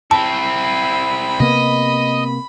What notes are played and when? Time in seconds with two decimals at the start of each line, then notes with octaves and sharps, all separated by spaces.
0.11 C4 E4 A5 B5
1.40 C3 A#3 B3 D#5